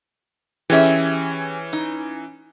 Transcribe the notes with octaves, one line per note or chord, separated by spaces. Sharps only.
E3 C#4 G4 G#4 E5
D#4